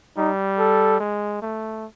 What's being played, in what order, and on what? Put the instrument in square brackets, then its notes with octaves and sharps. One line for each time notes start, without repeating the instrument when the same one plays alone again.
[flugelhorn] G3 [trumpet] D#4
[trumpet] A4
[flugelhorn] G#3
A3